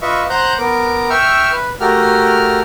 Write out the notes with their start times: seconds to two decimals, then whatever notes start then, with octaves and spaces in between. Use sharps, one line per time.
0.02 F4 B4 D#5 E5 C#6
0.30 C5 F#5 A#5 F#6 G6
0.58 B3 A#4 D6
1.10 E5 G5 C#6 E6 F6
1.52 B4
1.80 A3 F#4 G4 A4 A#4 F6